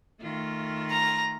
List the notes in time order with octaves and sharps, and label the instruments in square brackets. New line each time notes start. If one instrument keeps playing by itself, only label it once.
[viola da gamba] D#3 A3 F4
[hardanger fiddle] A#5